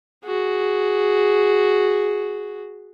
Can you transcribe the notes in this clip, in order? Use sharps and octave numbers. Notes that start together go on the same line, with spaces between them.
F#4 G#4